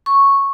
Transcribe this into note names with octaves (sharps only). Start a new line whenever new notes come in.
C#6